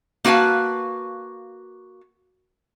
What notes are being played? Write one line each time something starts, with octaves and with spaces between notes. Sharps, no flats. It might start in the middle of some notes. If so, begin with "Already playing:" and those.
A#3 F#4 B4 F5 A5